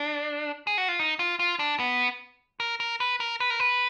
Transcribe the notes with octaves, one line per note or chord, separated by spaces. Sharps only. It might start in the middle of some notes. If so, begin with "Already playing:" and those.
Already playing: D4
G#4
F#4
F4
D#4
F4
F4
D4
B3
A#4
A#4
B4
A#4
B4
A#4
B4